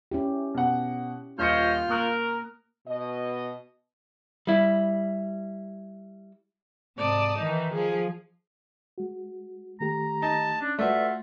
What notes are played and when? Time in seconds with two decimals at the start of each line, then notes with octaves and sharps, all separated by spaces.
0.12 C#4 E4 G4
0.54 B2 F#5
1.39 D#1 F4 C5 C#5 D#5 F6 G6 C#7
1.89 A#3 A#4 C#6 D#6 F#6
2.88 B2 D#5
4.47 G3 E4
6.97 G#2 C3 D5 A5 D#6
7.38 D#3 E3 D#4
7.72 F3 G#4
8.98 G#3 F#4
9.80 D#3 A3 G4 A#5
10.22 D#4 A5
10.61 C#4 D4
10.79 A3 F4 F#4 B4 D5 E5